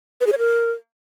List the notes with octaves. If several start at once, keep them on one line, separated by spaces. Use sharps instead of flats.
B4
G#4
C#5
A#4